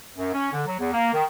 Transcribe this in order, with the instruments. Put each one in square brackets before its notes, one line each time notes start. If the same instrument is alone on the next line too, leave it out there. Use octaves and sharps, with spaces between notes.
[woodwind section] F#2
C#4
D3
F#3
E2
A#3
D#3